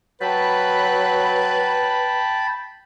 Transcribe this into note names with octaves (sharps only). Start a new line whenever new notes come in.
F#3 B4 G5 A5 B5